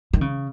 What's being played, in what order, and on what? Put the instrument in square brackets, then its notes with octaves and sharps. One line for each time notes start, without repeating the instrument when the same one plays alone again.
[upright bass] D#3
C#3